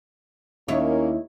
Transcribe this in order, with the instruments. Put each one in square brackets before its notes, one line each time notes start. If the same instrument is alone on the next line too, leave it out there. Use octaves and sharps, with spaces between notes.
[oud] D#2 E4 C#5 [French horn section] A#3 C#4